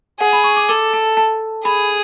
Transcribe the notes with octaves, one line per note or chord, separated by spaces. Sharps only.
G#4 F#5
B5
C#6
D6
A4 D6
A5
A5
G#4 B5